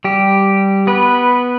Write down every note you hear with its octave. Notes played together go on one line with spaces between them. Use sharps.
G3 G4
B3 B4